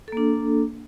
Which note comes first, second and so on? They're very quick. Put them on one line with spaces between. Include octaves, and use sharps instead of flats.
A4 A#3 D4